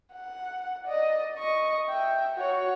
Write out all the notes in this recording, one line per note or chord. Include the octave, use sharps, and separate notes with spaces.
F#5
D5 D#5
D#5 C#6
E5 G5
F#4 C#5